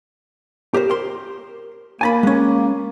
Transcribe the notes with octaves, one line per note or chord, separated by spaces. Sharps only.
G4 A#4 C5
A#4 C6
A#3 G#5 A5 B5
G#3 C#4